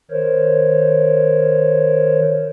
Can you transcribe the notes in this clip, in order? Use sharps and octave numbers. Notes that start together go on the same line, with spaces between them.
D#3 A#4 C5 C#5